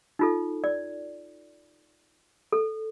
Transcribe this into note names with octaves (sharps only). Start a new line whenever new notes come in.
D#4 F4 A4
D5
A4